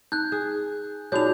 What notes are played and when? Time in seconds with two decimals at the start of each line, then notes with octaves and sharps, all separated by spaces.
0.12 D#4 F#6 G6
0.32 G#4
1.12 A#2 D4 D#4 F#4 G#4 C#5 G6 F7